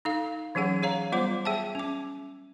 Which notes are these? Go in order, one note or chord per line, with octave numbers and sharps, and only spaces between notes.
D#4 A4 F5
E3 F#3 C#4 G#4 F#5
G#4 C#5 F5 A#5
G3 B3 F4 C5 F#5 D6
G#4 E5 G5 A5
C#4 D6